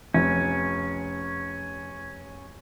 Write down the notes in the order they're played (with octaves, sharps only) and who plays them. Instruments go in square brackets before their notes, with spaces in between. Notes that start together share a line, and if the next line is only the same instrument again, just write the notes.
[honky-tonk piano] F1 [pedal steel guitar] C#4